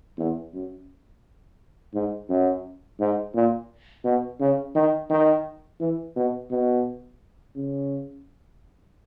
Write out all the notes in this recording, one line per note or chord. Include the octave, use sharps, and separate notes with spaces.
E2
F#2
G#2
F#2
G#2
A#2
B2
C#3
D#3
D#3
E3
B2
B2
C#3